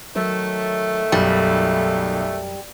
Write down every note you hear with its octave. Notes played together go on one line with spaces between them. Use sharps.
D#3 F#3 A3 A#4 C#5
B1 F#2 G3